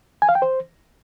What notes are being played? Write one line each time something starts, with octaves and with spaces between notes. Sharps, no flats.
G#5
F5
G5
C5